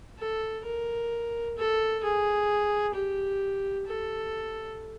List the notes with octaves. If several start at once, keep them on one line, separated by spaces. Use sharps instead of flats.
A4
A#4
A4
G#4
G4
A4